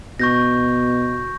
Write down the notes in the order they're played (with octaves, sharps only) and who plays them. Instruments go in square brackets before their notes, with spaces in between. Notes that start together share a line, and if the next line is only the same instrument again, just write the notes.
[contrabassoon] B2 [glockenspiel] C#6 G6 A#6